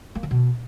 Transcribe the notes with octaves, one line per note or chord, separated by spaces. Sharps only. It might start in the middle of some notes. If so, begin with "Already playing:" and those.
A#3
D3
B2